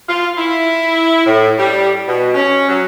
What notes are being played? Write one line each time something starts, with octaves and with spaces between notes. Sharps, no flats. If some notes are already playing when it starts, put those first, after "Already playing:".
F4
E4
A2
G3
B2
C#4
F#3